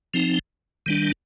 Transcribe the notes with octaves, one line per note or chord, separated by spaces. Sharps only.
F3 C4 D#4
D#3 G3 D4